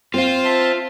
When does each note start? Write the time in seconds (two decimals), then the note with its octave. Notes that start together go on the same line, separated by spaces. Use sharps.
0.14 C4 F4 C5 F5
0.45 E5 A5 C6